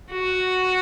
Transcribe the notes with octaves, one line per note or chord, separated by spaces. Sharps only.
F#4